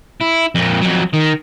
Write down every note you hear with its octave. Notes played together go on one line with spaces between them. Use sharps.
E4
F2 A#2
F2 F#3
D#3